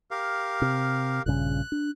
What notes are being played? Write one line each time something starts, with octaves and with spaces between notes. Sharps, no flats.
G4 A#4 F5
C3
A#1 G2 C#3 F#6
D4